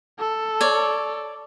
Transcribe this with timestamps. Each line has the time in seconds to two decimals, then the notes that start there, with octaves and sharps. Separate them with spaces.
0.19 A4
0.61 C#5 D5